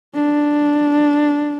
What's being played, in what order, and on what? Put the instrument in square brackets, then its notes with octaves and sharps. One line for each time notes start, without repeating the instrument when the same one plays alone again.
[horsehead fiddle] D4